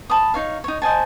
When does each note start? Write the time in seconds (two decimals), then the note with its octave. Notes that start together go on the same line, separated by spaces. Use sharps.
0.10 A5 B5 D#6
0.34 D#4 C#5 F5
0.64 D#4 C#5
0.82 C5 D#5 G#5 A5